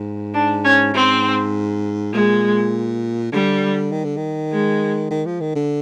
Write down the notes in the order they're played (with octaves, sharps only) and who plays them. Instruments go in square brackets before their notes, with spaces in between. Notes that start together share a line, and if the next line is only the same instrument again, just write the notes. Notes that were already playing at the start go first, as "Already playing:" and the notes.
Already playing: [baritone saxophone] G#2
[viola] D4
C#4
[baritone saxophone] G#2 [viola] C4
[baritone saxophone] A#2 [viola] G#3
[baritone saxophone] D3 [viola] G3
[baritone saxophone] D#3
D3
D#3
[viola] G#3
[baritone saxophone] D#3
F3
D#3
D3